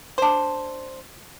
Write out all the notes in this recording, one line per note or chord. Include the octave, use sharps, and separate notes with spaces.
D4 C5